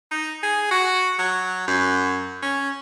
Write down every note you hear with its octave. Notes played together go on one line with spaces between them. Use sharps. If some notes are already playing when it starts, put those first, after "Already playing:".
D#4
G#4
F#4
F#3
F#2
C#4